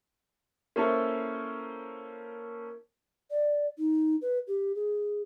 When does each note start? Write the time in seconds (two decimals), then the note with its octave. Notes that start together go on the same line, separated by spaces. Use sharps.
0.76 A#3 C#4 E4 A4 C5
3.31 D5
3.78 D#4
4.22 B4
4.47 G4
4.75 G#4